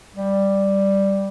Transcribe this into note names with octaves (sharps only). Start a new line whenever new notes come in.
G3